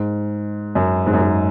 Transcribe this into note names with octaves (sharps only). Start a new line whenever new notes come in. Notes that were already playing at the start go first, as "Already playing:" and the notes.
Already playing: G#2
F#2
G#2
F#2
G#2